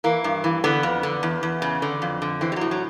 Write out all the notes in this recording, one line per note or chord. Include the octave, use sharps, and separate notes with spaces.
E3 A#3
G2
E3
D3 B3
F2
D3
E2
E2
C#3
D3
F2
D3
E3 C4
G3
A2 F#3
F#3